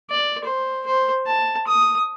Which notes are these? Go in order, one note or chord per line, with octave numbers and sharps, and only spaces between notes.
D5
C5
C5
A5
D#6